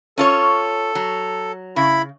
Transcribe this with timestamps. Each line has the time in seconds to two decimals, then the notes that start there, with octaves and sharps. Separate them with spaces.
0.18 C#4 F4 A4 C#5
0.95 F#3
1.76 C#3 E4 B5